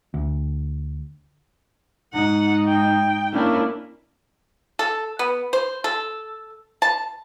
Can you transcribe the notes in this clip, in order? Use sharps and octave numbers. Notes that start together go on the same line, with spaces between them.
D2
G#2 D#4 F#5
G5
A#3 C#4 D4 E4
A4
B3
C5
A4
A5